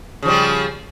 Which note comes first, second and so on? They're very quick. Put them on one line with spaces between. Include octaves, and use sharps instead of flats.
C#3 F3 G3